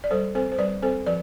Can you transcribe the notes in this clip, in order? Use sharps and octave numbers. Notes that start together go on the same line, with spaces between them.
D5
G3 A4 C5
C4 A4 C5
C5
G3 B4 D5
C4 A4 C5
F3 B4 D5